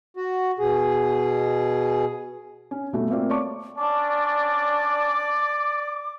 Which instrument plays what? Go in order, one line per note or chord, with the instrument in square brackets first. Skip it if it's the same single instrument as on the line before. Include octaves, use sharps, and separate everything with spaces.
[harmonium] F#4
B2 G#4
[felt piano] C#4
B2 G3 A3 F#4 A4
A3 A#3 C4 F4 D5
C#5 D5 A5 C#6 D6
[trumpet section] C#4 D4 [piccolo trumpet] D5 [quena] D6